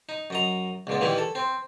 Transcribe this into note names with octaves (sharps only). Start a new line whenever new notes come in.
D#4
F#2 D#5 A#5
C#2 A#2 B3
D#3 E3 G3 E4
A4
C4